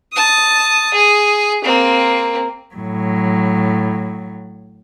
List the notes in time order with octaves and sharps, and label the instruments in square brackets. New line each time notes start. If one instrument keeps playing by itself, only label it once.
[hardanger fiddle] A5 D#6
G#4
A#3 C4
[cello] A2 F#3